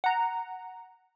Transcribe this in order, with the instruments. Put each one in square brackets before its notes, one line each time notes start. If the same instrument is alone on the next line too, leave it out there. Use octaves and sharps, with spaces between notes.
[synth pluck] F#5 A#5